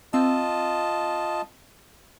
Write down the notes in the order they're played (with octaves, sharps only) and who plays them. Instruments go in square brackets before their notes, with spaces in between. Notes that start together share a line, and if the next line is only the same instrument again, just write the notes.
[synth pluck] C4 E6 [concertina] F4 D#5 A5